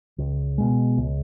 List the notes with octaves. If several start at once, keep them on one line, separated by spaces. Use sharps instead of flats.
C#2
B2 G#3
C#2